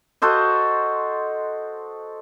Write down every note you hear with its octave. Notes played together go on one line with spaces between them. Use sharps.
F#4 A4 C5 D#5